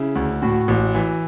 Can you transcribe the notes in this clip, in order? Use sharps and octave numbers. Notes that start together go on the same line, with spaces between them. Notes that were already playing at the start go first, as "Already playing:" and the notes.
Already playing: C#3 E4
D2
A2 F#4
A1
E3